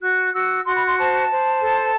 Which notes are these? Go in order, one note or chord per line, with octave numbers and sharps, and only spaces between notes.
F#4 F#6
F#4 E6
F#4 C6
B5
C6
C5 A5
C5
A4